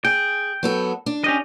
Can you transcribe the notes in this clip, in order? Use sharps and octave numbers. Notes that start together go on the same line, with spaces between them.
G#4 G5
F#3 B3 A4
D4
C#4 G4 D#5